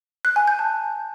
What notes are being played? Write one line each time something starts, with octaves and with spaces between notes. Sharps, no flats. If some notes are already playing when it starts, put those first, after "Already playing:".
F#6
G#5
G6
A5